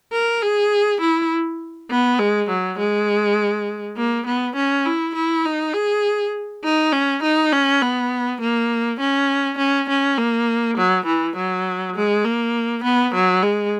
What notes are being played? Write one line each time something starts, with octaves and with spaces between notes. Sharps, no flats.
A#4
G#4
E4
B3
G#3
F#3
G#3
A#3
B3
C#4
E4
E4
D#4
G#4
D#4
C#4
D#4
C#4
B3
A#3
C#4
C#4
C#4
A#3
F#3
E3
F#3
G#3
A#3
B3
F#3
G#3